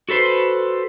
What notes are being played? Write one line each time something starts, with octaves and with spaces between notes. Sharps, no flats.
F#4 A4 B4 C5